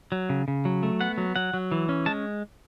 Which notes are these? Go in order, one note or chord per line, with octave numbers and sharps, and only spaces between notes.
F#3
C#3
C#3
F#3
A3
B3 F#5
F#3
F#3 F#5
F#3
E3
C#4
G#3 A5